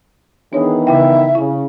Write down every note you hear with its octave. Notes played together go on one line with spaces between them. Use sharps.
D#3 E3 B3 D4 G#4 C#5
C#3 E4 E5 G5
C#3 E4